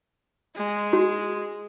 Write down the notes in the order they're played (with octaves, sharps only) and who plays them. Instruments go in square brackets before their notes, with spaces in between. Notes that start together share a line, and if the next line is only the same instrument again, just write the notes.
[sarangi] G#3
[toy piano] F#4